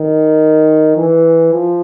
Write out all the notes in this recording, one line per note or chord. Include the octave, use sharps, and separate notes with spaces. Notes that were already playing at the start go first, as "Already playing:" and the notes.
Already playing: D#3
E3
F3